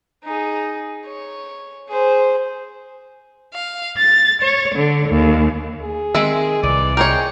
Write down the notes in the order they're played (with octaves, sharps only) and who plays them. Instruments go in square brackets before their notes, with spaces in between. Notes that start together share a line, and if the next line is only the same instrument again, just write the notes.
[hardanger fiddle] D#4 G#4
C#5
G#4 C5
[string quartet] F5
A6
C#5
D3
D#2
[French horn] G#4
[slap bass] D#3 [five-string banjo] G#3 C4 E5
[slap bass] C2 [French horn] E3 [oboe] D5
[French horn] G#3 [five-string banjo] A#4 C5 C#5 [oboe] G5